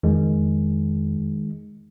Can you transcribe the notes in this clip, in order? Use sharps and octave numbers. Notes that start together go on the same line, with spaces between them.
F2 D#3 G#3